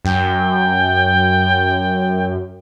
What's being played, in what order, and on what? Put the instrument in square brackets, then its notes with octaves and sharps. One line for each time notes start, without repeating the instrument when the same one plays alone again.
[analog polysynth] F#2 [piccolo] G5